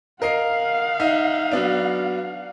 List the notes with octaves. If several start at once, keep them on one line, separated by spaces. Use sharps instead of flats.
A#4 D#5 F5 F#5 C7
D#4 E5
F#3 B3 D4